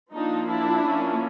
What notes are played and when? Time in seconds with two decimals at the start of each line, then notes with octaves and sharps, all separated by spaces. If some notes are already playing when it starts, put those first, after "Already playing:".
0.12 F3 A#3 D4 D#4
0.49 D4 E4
0.86 F3 A#3 C#4